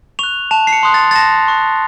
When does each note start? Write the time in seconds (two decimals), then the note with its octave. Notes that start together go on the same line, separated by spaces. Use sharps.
0.19 C#6 F#6 F7
0.51 A5 F7
0.67 C7
0.72 C#7
0.83 C6 D#6 F#6
0.94 A6
1.11 A6
1.15 A5 A#6
1.48 C#6 F#6